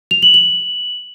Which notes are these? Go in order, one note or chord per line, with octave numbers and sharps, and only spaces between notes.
F7
F#7
F#7